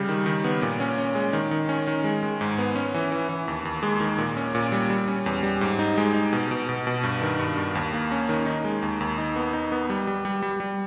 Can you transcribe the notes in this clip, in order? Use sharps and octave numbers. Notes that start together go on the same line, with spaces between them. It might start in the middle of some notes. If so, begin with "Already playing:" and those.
Already playing: C#3 G3
D#3
D#3
B3
A#2
C#4
C#4
G#3
D#3
D#3
C#4
D#3
G#3
G#3
G#2
B3
C#4
E3
E3
E3
D#2
D#2
G#3
D#3
A#2
C#4
A#2
G3
G3
C#4
E2
G3
G#2
D#4
G#3
D#4
B2
B2
B2
B2
G2
D#3
G2
G2
D#2
A#3
C#4
D#3
D#4
G#3
D#2
D#2
D#4
B3
D#4
B3
G3
G3
G3
G3
G3